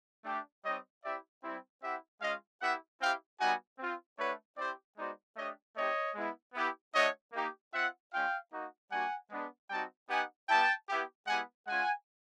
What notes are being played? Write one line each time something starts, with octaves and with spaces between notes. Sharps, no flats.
A3 D4 G4
G3 C4 D#4 C#5 D#5
C4 E4 G4 D5 E5
G3 C4 E4
C4 E4 G4 E5 F#5
G#3 C#4 F4 D#5 F5
B3 E4 G4 E5 F#5
C4 E4 G4 F5 G5
G3 B3 D#4 F#4 F#5 G#5
C4 F4
A3 D4 F#4 B4 C#5
C4 E4 G4 C5 D5
G#3 B3 D#4 F#4 C5 D5
A3 D4 G4 C#5 D#5
A3 C4 D#4 G4 C#5 D#5
G#3 B3 E4
B3 E4 G4
A3 D4 F#4 C#5 D#5
A#3 D#4 G4
C4 F4 E5 F#5
G#3 C#4 F4 F5 G5
A#3 D#4 F#4
G3 A#3 D4 F#4 F#5 G#5
G#3 B3 D4
G3 C4 D#4 F#4 G5 A5
B3 D#4 G4 F#5 G#5
G3 B3 E4 G4 G5 A5
B3 E4 G4
G#3 B3 E4 G4 F#5 G#5
G#3 C#4 F4 F#5 G#5